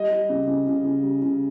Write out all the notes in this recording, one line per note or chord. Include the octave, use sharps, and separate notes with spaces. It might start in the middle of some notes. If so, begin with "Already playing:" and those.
Already playing: G3 D#5
G3
C#3
C#3
C#3
C#3
G3
C#3